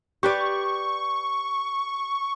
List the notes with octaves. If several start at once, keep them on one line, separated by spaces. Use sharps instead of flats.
G4 B4 D5 C#6